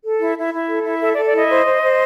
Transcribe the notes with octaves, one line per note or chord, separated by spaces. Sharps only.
A4
E4
E4
E4
A4
E4
A4 E5
D5
A4
D5
E4 D#5
C5
C5
C5